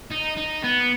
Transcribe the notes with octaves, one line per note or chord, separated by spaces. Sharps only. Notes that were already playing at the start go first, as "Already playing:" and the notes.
D#4
D#4
B3